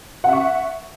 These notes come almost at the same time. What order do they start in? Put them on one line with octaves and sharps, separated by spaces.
F#5 E5 C#6